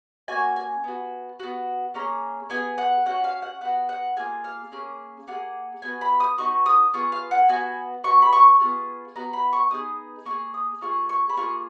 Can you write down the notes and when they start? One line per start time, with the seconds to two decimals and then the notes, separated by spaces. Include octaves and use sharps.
0.28 A#3 C#4 F#4 G#5
0.56 G#5
0.84 B3 F#4
1.40 B3 F#4
1.94 A#3 C#4 G#4 A#5
2.50 B3 F4 G#4 G#5
2.78 F#5
3.06 C#4 F#4 F#5
3.24 F5
3.42 F#5
3.61 B3 F#4 F#5
3.89 F#5
4.16 A#3 F4 G#4 G#5
4.44 F5
4.72 A#3 C#4 G#4
5.27 A#3 F4 G#4 F#5
5.82 B3 F#4 G#5
6.01 B5
6.20 D#6
6.38 B3 D#4 F#4 C#6
6.66 D#6
6.93 B3 F4 G#4 C#6
7.12 F5
7.31 F#5
7.48 B3 F#4 G#5
8.04 B3 F#4 C#6
8.22 B5
8.33 C#6
8.60 B3 F4 G#4
9.15 B3 F#4 A#5
9.33 B5
9.53 C#6
9.71 B3 D#4 G#4 D#6
10.25 A#3 F4 C#6
10.31 G#4
10.54 D#6
10.81 A#3 F4 G#4 C#6
11.09 C#6
11.29 B5
11.37 A#3 F4 G#4 C#6